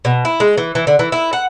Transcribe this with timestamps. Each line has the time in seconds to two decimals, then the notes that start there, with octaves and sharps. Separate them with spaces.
0.05 B2
0.25 E4
0.40 G#3
0.58 E3
0.75 E3
0.87 D3
0.99 E3
1.12 E4
1.33 F#5